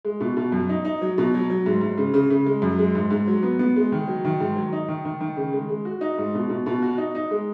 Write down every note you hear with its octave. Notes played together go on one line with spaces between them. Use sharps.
G#3
B2
B2
F#2
D#4
D#4
F#3
B2
F#3
F#3
G#2
G#2
C#3
C#3
C#3
G#3
F#2
G#3
G#2
G#2
F#3
B3
B3
G#3
D#3
F#3
D#3
G#2
F#3
D#4
D#3
D#3
D#3
C#3
G#3
G#3
F#4
D#4
G#2
B2
B2
B2
F#4
D#4
D#4
G#3